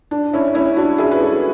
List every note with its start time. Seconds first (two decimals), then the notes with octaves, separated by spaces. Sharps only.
0.11 D4
0.33 C#4 E4
0.55 C#4 E4
0.77 D4 F#4
0.98 E4 G#4
1.11 B4
1.21 F#4 A4